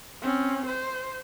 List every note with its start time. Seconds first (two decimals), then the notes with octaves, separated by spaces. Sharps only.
0.21 C4 C#4
0.66 C5